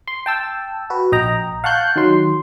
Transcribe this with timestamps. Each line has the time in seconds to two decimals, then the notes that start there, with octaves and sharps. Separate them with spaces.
0.08 C6
0.26 G5 A5 E6
0.90 F#4 B4
1.12 A#1 D#5 G5 A#5
1.64 F5 F#5 A5 C#6 F#6 G6
1.96 D#3 F#3 C6